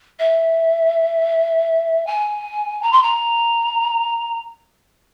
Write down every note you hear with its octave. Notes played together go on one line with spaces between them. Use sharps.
E5
G#5
A#5
C6
A#5